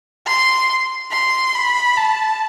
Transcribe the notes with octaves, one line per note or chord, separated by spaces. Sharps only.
C6
C6
B5
A5